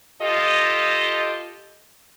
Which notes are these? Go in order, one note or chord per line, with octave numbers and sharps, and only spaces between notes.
F4 G4 A4 D#5